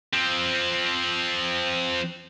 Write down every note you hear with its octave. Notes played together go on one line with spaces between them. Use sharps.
F3 C4